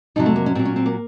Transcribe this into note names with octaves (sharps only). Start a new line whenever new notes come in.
F2 C3 F#3 D#4
A3
A#3
C#4
A#2 F#3 C4
C#4
C4
A#3